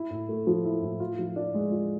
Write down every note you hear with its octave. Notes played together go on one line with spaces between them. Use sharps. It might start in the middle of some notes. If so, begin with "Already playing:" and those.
Already playing: E4
A2
A3
F3
E4
A2
F4
F3
D4
G#3
F4